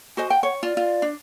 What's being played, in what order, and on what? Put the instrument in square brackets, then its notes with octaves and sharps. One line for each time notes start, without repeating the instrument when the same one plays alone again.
[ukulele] F#4 C5 D#5 [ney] G#5
[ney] F#5 [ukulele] G5
[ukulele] C#5
[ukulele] F4 [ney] D5
[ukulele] F4
D4